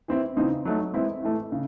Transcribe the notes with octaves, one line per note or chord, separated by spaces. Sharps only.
E3 C4 E4
C#3 E3 C4 D#4
F#3 A3 D#4
E3 G#3 C4 E4
A2 E3 A3
C#3